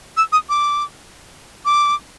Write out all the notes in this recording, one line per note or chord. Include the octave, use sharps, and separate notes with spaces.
E6
D#6
D6
D6